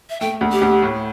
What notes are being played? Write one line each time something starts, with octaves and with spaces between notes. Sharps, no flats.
E5
A3 G5
D2
G4
D2
A2